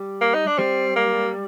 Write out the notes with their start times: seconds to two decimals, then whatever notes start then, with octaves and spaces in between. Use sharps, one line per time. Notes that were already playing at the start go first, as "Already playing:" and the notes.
Already playing: G3
0.21 A#3
0.34 D#4
0.47 D4
0.58 G3 C4
0.96 A#3